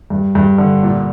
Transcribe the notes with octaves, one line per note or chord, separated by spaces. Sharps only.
G2
G2
D3
A#2